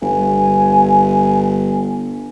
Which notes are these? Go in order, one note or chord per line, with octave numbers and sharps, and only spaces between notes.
G1 G#5